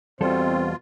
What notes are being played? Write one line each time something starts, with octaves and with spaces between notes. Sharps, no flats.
E2 B2 G3 C4 F4 A4 C5